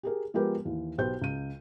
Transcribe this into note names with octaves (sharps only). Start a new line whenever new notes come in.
G4 G#4 A#4
F3 G#3 B3 G4 A#4 B4
D#2 E3
B1 G4 B4 C5 G5 G6
C#2 D#7